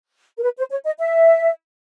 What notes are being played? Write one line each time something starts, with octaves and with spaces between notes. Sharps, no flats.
A#4
B4
C5
C#5
D#5
E5